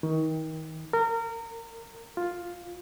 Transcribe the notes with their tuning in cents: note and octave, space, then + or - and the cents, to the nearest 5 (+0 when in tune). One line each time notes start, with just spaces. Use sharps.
D#3 +30
A#4 -25
F4 +5